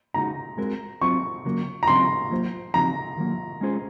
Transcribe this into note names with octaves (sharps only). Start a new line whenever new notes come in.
C#3 G#3 D#4 F#4 A#5
G#3 C4 F#4 A#4
F#3 C4 F4 C#6
C#3 F#3 A#3
A#5
C#3 F#3 C4 F4 C6
F#3 A#3 F4 C5
C#3 F3 C4 D#4 F#4 A#5
D#3 F#3 A#3
G#3 C#4 F4 G#4 C5